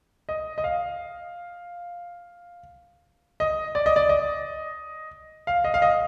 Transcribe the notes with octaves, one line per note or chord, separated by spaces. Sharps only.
D#5
D#5
F5
D#5
D5
D#5
D5
D#5
F5
D#5
F5
D#5